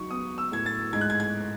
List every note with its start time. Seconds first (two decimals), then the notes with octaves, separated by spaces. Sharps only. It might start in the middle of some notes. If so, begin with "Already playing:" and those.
Already playing: F#3 D#4 C#6
0.10 B3 D#6
0.38 E6
0.52 A2 G#6
0.66 A6
0.93 G#2 G#6
1.01 F#6
1.10 G#6
1.20 G#6